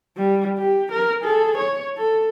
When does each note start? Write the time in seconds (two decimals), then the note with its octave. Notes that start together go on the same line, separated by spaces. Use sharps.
0.17 G3
0.58 G4
0.92 A#4
1.22 G#4 A4
1.57 C#5
1.98 A4